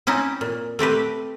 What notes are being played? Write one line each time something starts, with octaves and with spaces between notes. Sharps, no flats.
C4 C#4 D#4 E4
A#2
A3 C4 G4 B4